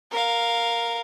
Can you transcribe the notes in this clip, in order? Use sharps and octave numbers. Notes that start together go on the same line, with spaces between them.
A#4 F5